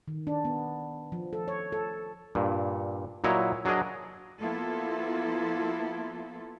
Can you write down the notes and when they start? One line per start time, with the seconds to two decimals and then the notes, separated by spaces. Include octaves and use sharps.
0.08 D#3
0.27 D4
0.45 B3
1.12 F3
1.33 A4
1.48 C#5
1.72 A4
2.35 G2 A#2
3.24 A#2 F#3 E4 C#5 D#5 A#5
3.65 F#3 D4 G#4 A#4 D#5
4.40 F3 A#3 B3 E4 F4 A4